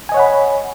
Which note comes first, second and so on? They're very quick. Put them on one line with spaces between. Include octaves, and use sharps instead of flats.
G#5 D#5 C#5 F#5 B5